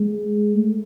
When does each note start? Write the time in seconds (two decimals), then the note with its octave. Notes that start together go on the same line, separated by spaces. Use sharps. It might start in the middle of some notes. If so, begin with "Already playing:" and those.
Already playing: G#3
0.55 A3